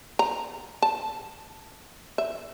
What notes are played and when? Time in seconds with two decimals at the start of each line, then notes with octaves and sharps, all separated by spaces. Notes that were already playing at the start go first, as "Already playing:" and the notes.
0.19 A#5
0.82 A5
2.18 E5